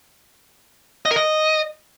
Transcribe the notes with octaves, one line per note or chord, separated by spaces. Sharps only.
D#5
A#4
D#5